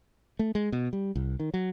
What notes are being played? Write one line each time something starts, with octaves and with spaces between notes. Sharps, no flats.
A3
G#3
B2
G3
C2
D#3
F#3